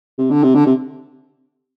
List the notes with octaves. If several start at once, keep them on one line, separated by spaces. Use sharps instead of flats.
C3
D3
C3
D3
C3